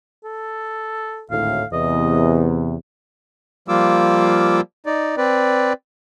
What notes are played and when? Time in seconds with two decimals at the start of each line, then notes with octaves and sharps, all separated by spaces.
0.24 A4
1.31 G#1 D2 A2 F5
1.73 E2 C3 D#5
3.68 F3 G3 A#3 F4 D6 E6
4.86 D#4 D5
5.17 C4 B4 D5